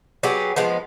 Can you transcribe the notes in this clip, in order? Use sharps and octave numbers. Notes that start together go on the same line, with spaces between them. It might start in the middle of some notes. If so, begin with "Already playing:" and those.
F#3 B3 G4 G#4
F3 G#3 B3